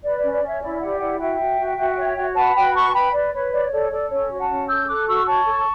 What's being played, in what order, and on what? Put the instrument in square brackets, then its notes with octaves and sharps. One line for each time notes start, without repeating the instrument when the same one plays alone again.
[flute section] B4 D5
D5
C#4
D5
C#4
C#5 E5
E4 D5
G4 D5 F#5
E4 D5 F#5
F#4 E5 G5
F#4
F#4
F#4
C#5
F#4
B4 F#5 A5
F#4 G5 B5
B4 A5 C#6
A5
B4 G5 B5
B4 D5
B4 C#5
C#5 D5
A4 D5
A4 D5
C#4 C#5
F#4
F#5 A5
C#4
A4 E6 G6
A4 D6 F#6
F#4 C#6 E6
C#5 A5 C#6
A4